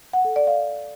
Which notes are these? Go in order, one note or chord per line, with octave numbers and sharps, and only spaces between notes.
F#5
A4
D5
F5